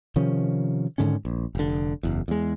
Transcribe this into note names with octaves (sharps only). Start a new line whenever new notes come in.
C3 D#3 F3 C#4
G#2 D3 D#3 C#4
A#1
F1 D3
F#1 E2
E2 G#3